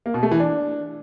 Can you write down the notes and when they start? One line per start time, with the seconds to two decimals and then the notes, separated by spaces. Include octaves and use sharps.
0.06 A#3
0.14 B2
0.23 A3
0.31 E3
0.40 D4